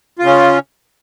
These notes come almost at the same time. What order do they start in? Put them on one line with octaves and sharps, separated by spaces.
F4 C#3 C#4